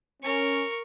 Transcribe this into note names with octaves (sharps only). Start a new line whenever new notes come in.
C#4 A#4 C#6